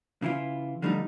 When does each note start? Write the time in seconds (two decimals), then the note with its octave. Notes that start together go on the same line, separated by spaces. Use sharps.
0.22 C#3 E3 E4 F4
0.82 D3 F3 G3 A3 C4 D#4